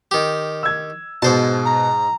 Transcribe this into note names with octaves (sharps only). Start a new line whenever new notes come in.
D#3 G4
E6 G#6
G#2 B2 C5 A5
A#5